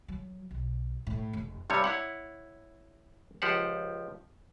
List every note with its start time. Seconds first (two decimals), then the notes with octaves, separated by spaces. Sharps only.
0.08 F#3
0.51 B1
1.07 A2
1.33 F1
1.70 G2 C3 G3 C#5
1.84 E4 C#5 F#5
3.42 C#2 F3 G4 C5 F#5